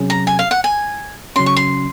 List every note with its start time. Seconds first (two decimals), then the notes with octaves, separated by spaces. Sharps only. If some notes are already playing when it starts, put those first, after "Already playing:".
Already playing: C3 F#3 C#4 G#4
0.10 A#5
0.27 G#5
0.39 F5
0.51 F#5
0.64 G#5
1.36 C#3 F#3 C#4 C6
1.46 C#6
1.56 C6